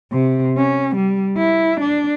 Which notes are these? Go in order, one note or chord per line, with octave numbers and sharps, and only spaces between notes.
C3
C#4
G3
E4
D4